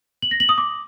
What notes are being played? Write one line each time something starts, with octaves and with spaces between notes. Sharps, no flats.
F#7
A#6
F#7
D#6
D6